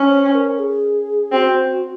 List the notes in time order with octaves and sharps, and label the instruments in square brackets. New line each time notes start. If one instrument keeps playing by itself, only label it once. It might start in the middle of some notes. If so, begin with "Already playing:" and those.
Already playing: [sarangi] C#4
[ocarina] C5
A#4
G#4
[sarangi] C4 [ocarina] F#4